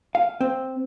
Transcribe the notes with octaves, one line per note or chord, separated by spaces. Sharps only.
F5
C4